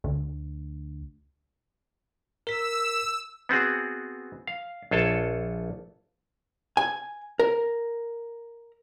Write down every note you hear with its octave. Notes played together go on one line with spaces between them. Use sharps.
D2
A#4 E6 B6
B3 C4 F#4 G#4
F5
A#1 F4 A4 C#5 A5
G#5
A#4